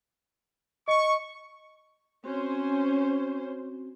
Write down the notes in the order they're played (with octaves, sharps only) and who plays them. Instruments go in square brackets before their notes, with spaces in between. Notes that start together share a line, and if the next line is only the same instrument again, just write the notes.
[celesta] D#5 [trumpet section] C#6
[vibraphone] C4 F#4 [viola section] C#4 C5